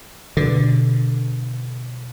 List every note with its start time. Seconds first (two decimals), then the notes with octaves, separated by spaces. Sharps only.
0.37 B2 D3